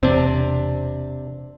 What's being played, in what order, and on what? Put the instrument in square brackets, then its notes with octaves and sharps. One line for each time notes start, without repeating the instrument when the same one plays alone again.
[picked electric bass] E1 C4 [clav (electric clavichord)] C3 D4